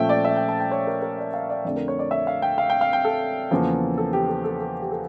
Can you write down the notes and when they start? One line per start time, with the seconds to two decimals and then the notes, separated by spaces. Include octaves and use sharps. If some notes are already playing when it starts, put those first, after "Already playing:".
Already playing: A#2 F3 A3 C#4 E5 G5
0.09 D5
0.25 E5
0.36 G5
0.49 A5
0.60 G5
0.71 C#5
0.87 A#4
1.02 A#4
1.18 D5
1.34 F5
1.50 D5
1.65 F2 D3 A3 D5
1.76 A#4
1.88 C#5
1.99 D5
2.11 E5
2.27 F5
2.42 G5
2.58 F5
2.70 G5
2.81 F5
2.93 G5
3.05 A4
3.51 E2 C#3 F3 A#3
3.98 A4
4.13 G4
4.28 A4
4.44 A4
4.60 A4
4.82 G4
4.91 A4